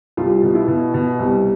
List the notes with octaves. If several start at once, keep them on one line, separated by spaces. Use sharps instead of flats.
C2 F4
B2
E4
B2
B2
C2